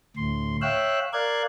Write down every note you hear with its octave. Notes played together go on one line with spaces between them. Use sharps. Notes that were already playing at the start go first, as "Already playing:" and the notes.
D2 A2 C6
C#5 E5 F5 G5 E6 F#6
A#4 D5 F5 F#6 G#6